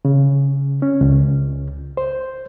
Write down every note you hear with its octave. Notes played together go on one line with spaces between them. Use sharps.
C#3
C#4
C#2
C5